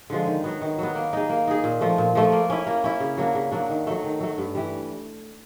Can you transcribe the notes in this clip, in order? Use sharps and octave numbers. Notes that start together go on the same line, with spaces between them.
D3 F3 G#3
D#3
F#3 B3
D#3
F#3 B3
A#3
D#4 G#4
A#3
D#4 G#4
A#2
F3 A3
A#2
F3 A3
A#3
C#4 E4
A#3
C#4 E4
C#3
F#3 A#3 D4
C#3
F#3 A#3 D4
D#3
F#3 A3
D#3
F#3 A3
G2
E3 G3